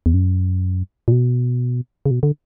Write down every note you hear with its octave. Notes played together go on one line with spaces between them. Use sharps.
E2
F#2
A#2
B2
C#3
B2
D3